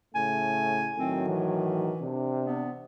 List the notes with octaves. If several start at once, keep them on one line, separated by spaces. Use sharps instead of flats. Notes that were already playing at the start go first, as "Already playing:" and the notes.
A2 C#3 A3 G#5
A2 D#3 F#3 C4
E3
C3 D4
B3